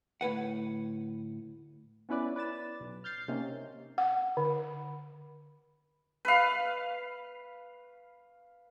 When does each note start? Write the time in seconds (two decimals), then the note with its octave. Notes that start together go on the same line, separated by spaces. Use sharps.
0.21 D2 A2 B4 F#5
2.09 B3 C#4 E4 B4 D5
2.36 B4 D5 A6 E7
2.80 B1
3.04 F6 G6 A6 C7
3.28 C3 A#3 C#4 D#4
3.98 F#5
4.37 D3
6.25 B4 F5